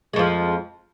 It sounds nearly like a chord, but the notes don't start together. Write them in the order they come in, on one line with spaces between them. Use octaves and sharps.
G#3 F2 F3